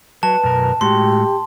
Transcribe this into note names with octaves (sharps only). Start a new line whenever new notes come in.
F#3 B4 A5
F#2 B2 A#4
A2 G#3 F#4 G4 C6